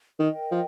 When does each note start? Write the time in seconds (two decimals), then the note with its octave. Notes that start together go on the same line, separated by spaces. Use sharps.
0.19 D#3 A#4 D#5 G5
0.51 F3